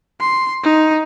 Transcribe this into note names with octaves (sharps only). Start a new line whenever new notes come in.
C6
D#4